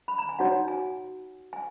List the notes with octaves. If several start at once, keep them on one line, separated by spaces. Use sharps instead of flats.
B5
A#5
G#5
D#4 F#4 C#5 F#5
G#5
G#5